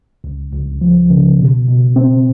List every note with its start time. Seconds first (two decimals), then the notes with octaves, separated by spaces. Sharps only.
0.24 C#2
0.53 C#2
0.81 F3
1.10 C#3
1.39 B2
1.68 B2
1.96 C4